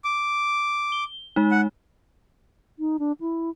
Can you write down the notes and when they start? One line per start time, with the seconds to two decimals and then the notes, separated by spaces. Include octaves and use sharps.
0.04 D6
0.92 G7
1.36 G#3 D#4
1.51 F#5
2.79 D#4
2.99 D4
3.21 E4